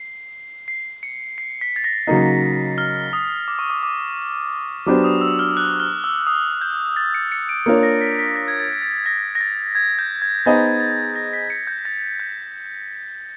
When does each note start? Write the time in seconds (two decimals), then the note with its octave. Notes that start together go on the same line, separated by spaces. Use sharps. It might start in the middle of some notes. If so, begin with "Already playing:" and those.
Already playing: C7
0.68 C7
1.03 C#7
1.38 C7
1.61 B6
1.76 A6
1.84 A#6
2.07 C#3 F#3 A#3 D#4
2.78 F6
3.13 D#6
3.48 D6
3.59 C#6
3.70 D6
3.83 D6
4.86 F#3 B3 D4 G4 C5 D6
5.04 D#6
5.21 E6
5.39 F6
5.57 F#6
5.80 F6
6.04 E6
6.27 D#6
6.61 G6
6.96 A6
7.14 C#7
7.32 C#7
7.49 D7
7.66 A#3 D4 F4 A#4 C#5 C#7
7.83 A#6
8.01 B6
8.19 B6
8.36 A#6
8.48 G#6
8.60 A6
8.82 A6
9.06 A#6
9.35 A#6
9.41 A6
9.75 G#6
9.99 G6
10.22 G#6
10.46 B3 D#4 G#4 C5 D#5 A6
10.80 A6
11.15 A#6
11.33 B6
11.50 C#7
11.67 G6
11.85 A6
12.20 G6